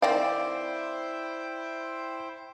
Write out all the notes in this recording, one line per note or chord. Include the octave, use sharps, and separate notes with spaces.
D#3 C4 E4 C5 D5 F5 G5 D6